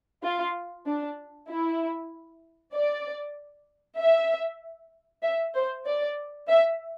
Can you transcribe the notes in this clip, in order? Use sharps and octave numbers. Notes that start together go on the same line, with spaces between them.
F4
D4
E4
D5
E5
E5
C5
D5
E5